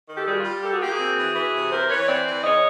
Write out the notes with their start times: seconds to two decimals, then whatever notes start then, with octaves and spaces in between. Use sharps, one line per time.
0.09 D#3
0.15 G4 A4
0.26 G3 F#4 G#4
0.40 G3 F4
0.63 A#3 G4 A4
0.72 F#4 G#4
0.81 A#3 F4 G4
0.90 F#4 G#4
0.99 C4
1.18 E3
1.36 E3
1.53 C3
1.72 E3 A#4 C5
1.89 E3 B4 C#5
2.08 C4 C5 D5
2.26 E3
2.44 C#3 C#5 D#5